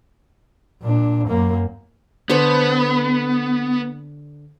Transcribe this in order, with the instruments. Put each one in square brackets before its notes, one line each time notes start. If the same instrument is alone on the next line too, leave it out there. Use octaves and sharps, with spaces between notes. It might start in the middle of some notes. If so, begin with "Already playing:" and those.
[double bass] A#2 D4
F#2 A#3
[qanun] D3 A4 C5 [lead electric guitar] B3